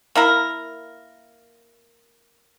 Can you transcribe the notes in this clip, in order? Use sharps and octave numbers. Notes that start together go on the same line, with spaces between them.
A#3 E4 A#4